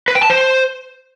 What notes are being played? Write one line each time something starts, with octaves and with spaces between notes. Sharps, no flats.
B4
G5
A5
C5